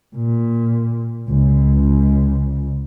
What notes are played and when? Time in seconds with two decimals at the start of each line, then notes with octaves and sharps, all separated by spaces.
0.16 A#2
1.28 C#2